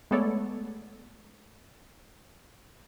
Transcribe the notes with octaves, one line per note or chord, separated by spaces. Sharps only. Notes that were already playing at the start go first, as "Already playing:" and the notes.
G#3 A3 B3 A4 C#5 D5